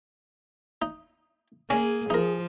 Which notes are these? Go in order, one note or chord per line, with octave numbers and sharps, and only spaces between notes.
D#4
A#3 C#4 G#4
F3 D#4 A#4